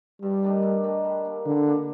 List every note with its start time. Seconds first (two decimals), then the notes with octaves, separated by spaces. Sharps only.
0.22 G2 G3
0.43 D#3 A3 D4
0.63 G2
0.84 D#3 A3 D4
1.05 G3
1.25 A#3 D4
1.45 D3 G3
1.66 A#3 D4